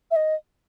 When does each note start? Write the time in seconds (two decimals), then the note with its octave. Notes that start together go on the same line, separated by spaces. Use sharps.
0.11 E5
0.16 D#5